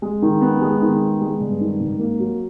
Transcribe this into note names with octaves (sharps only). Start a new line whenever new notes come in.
G#3
D#3
B3
G#3
D#3
B3
G#3
G2
D#3
G#2
A#3
F#3